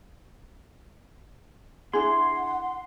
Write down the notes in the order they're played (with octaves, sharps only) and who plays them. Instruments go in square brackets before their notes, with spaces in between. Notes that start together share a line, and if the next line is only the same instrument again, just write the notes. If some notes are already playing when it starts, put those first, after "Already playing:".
[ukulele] D4 E4 G#4 [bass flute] F#5 [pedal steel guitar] C6